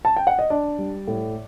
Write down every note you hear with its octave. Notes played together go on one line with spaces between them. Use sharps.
A5
G5
F#5
D#5
D4 D5
G3
A2